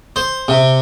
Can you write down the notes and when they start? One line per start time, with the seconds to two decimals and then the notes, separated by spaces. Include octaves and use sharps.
0.16 C5
0.48 C3